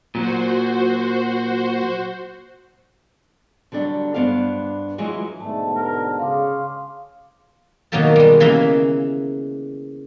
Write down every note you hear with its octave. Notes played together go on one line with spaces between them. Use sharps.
A#2 F#3 F#4 C5
D3 F#3 G3 D4
G2 B3 D4 C5 F5
E3 F#3 G#3 E4 F4 G#4
G#2 B2 D3 A3 A5
A#4
C#3 F5 C6 D6
B2 D#3 F#3 A#3 G4 A4
G3 G#3
C#3 E3 A#3 G#4 D#5 E5